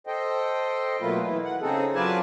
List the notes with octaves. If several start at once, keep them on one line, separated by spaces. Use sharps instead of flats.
A4 C5 D#5 G5
B2 F#3 A3 A#3 F4 B4
E3 E4
F#5
C#3 C4 D#4 G#4 A4
F#3 F4 B4 D5 G#5 A5